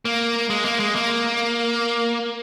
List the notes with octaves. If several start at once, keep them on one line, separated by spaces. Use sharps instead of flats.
A#3
G#3
A#3
G#3
A#3